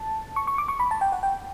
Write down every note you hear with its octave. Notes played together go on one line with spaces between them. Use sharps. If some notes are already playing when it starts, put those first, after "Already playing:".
Already playing: A5
C#6
C#6
D6
C#6
B5
A5
G5
F#5
G5